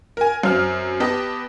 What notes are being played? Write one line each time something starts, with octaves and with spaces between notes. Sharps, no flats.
A#4 G#5
F#2 C4 F6
B3 G4 D#5 A5